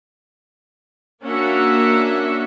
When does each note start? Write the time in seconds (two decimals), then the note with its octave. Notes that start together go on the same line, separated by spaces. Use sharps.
1.24 A#3 C#4 D4 F#4 E5 F#5